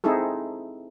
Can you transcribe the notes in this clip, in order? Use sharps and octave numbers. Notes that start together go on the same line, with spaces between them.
C4 D#4 E4 G#4 A4